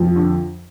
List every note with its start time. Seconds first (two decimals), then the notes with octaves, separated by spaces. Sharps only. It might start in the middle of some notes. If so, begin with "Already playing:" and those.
Already playing: F2 F3
0.16 D3